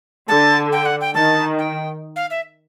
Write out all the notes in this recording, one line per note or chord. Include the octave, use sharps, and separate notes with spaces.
D3 A5
G5
F#5
G5
D#3 A5
G5
F5
E5